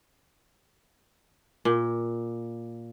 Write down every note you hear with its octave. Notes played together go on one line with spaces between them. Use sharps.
A#2